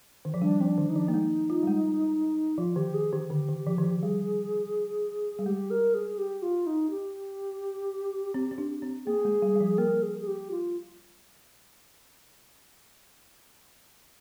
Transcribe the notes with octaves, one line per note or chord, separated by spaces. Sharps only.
D#3
F3
G3 D4
F3 C4
D4
D#3
D#4
F3 D4
A#3 D#4
G#3
F4
G3
G#3
F3 F4
D#3 G4
G#4
D#3 G4
D3
D#3
F3
D#3
F3
G3 G#4
G3
G#3 G4
A#4
G#4
G4
F4
D#4
G4
C4
C4
D4
C4
A#3 G#4
G#3
G3
G3
F3
A#3 A#4
G#4
G#4
G4
F4